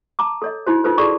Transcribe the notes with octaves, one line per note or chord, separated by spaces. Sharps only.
A5 A#5 D6
A4 C#5 D#5
D#4 E4 F#4 C5
D#4 F4 A4 B4 C5
F#4 G#4 A4 D5 A5 C#6